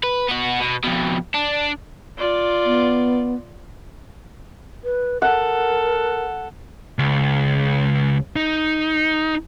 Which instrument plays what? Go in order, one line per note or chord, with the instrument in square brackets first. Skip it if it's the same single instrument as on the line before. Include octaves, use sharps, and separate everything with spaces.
[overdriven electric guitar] B4
B3 F#4
B2
F2 B2
D4
[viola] F4 D5
[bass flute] B3
[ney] B4
[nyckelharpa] A4 [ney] A#4 [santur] F#5
[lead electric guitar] C#2
D#4